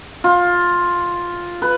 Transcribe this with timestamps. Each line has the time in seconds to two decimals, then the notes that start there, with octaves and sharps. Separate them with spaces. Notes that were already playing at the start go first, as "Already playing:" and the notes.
0.24 F4
1.62 B4